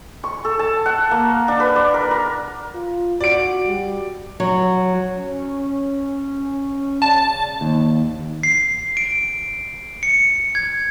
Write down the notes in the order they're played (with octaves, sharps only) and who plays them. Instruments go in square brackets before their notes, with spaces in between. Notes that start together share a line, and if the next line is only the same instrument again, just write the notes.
[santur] C#6
A4
A5
F#5
A#3
D4
B4
D5
A#4
A#4
[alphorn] F4
[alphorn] F#4 [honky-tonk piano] D5 D7
[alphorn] G3
[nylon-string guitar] F#3
[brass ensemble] C#4
[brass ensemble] C#3 D5 [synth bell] A5
[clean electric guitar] D#2
[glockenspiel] C7
D7
C#7
G#6